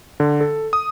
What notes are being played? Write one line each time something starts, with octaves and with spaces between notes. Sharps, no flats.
D3
A4
D#6